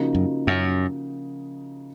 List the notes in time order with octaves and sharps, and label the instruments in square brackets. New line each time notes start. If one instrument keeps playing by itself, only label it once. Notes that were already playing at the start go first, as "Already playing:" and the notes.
Already playing: [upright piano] C#3 F3 A#3 D#4 F#4
[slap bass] F#2
F#2